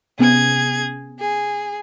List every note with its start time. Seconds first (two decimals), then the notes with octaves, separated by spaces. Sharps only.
0.19 C3 B3 C#4 G#4 G#6
1.19 G#4